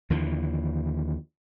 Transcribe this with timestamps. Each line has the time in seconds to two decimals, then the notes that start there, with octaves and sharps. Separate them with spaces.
0.10 D#2 D3 E3 F3